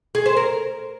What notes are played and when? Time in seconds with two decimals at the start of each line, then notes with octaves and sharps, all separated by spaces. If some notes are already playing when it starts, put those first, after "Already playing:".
0.15 G#4
0.26 C5
0.37 A#4